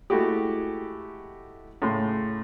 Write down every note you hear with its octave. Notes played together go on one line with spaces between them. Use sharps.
G#3 A3 E4 F#4 G4
A2 C#3 C6